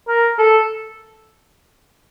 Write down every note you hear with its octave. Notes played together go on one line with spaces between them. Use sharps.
A#4
A4